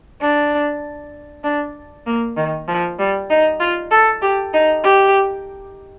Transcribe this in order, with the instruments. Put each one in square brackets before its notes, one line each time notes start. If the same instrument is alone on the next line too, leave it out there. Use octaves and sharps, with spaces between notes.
[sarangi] D4
D4
A#3
D#3
F3
G3
D#4
F4
A4
G4
D#4
G4